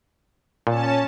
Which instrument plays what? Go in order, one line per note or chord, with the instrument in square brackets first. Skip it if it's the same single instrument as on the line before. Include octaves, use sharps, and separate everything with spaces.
[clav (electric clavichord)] A#2 [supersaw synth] C#4 A5